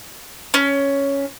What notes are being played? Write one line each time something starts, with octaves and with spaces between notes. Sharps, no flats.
C#4